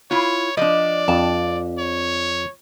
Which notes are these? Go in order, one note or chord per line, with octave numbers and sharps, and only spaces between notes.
E4 F4 C#5
F3 D4 D5 D#5
F2 A5
C#5